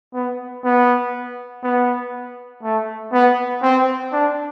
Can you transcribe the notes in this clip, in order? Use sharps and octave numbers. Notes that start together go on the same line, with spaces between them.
B3
B3
B3
A3
B3
C4
D4